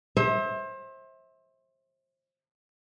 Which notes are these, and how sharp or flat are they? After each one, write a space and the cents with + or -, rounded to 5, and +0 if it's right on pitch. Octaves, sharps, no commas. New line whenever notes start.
C5 +30 E5 -25